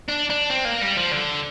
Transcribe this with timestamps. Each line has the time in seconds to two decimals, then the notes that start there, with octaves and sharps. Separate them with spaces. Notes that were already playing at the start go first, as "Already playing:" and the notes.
0.09 D4
0.30 D4
0.50 C4
0.65 A#3
0.82 G3
0.97 F3
1.12 D3